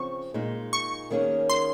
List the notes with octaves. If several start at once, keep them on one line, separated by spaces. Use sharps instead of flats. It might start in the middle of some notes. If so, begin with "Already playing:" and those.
Already playing: C#3 F3 C4 C#6
A#2 G#3 D#4
C#6
D#3 A#3 C#4 G#4
C6